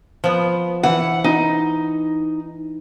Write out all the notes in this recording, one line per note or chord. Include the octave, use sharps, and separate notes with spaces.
F3 B3
E3 F#5
D#4